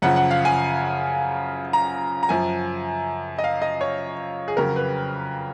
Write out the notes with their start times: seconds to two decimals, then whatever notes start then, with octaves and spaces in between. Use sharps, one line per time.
0.02 F#2 C#3 F3 F#5
0.16 F#5
0.31 F5
0.45 G#5
1.73 A#5
2.23 A#5
2.29 F#2 F3 G#5
3.39 D#5
3.44 F5
3.62 D#5
3.81 C#5
4.48 G#4
4.57 F2 C#3 F#3 A#4
4.76 B4